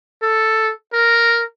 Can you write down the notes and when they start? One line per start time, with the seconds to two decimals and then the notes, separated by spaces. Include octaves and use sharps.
0.22 A4
0.93 A#4